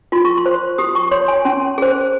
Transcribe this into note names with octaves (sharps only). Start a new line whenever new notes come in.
F4 C6
C#6
C6
C5
G4 D#6
C#6
C#5 C6
G#5
C#4 C6
G#4 C5